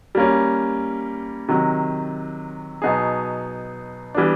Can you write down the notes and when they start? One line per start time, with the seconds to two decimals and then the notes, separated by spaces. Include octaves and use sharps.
0.15 G3 A#3 C#4
1.48 C3 D#3 F#3
2.82 B2 F#3 B3 D#4 G#4
4.14 E3 G3 B3 D4